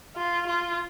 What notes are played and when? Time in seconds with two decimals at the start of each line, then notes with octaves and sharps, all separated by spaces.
0.17 F4
0.47 F4